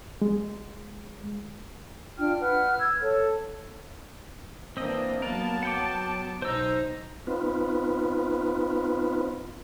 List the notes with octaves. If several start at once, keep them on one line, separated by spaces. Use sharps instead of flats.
G#3
D4 F4 G5 F6
B4 F#5 F6
E6 G#6
A4 C#5
E3 A#3 C4 D4 D#5
F#3 A#3 B3 A#4 A5
F#5 G5 D6
B1 D#4 C5 E6
B3 C4 D#4 F4 B4